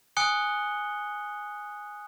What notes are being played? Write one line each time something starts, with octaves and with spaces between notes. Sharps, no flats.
G#5 D#6 F#6 C#7 G7